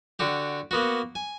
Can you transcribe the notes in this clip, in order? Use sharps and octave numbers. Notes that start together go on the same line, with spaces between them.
D3 F#4 G4
A#3 B3 F#4
G#5